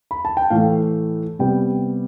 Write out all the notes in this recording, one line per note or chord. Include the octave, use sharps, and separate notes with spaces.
B5
A5
G5
A2 E3 A3 F5
C3 G3 B3 G5